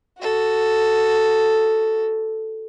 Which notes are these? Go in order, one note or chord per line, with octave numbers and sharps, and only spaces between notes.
F#4 A4